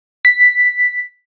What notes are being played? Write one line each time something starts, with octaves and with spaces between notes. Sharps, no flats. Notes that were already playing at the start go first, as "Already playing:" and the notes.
B6